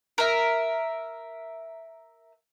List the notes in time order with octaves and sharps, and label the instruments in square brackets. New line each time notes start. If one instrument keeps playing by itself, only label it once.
[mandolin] A#4 E5